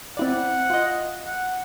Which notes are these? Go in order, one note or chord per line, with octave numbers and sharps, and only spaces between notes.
C4 E4 D5 F#5
F4 D#5
F#5